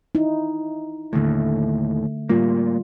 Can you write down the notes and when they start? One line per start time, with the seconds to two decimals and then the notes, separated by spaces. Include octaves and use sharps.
0.15 D#4 E4
1.13 D#2 A2 D3 A3
2.29 A2 G3 A#3 F4